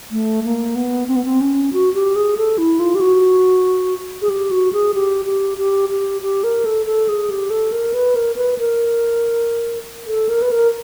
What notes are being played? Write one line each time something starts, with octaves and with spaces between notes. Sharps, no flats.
A3
A#3
B3
C4
B3
C4
C#4
F#4
G4
G#4
A4
E4
F4
G4
F#4
G#4
G4
F#4
G#4
G4
G4
G4
G4
G4
A#4
A4
A4
G#4
G4
A4
A#4
B4
A#4
B4
A#4
A4
A#4
B4
A#4